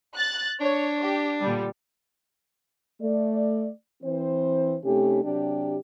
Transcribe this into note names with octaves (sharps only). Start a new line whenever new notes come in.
F#6 A6
D4 C#5
G4
A#2 D3 G3
A3 D5
E3 C4 C5
C3 A3 C#4 D#4 G4
C3 F#3 D4 G4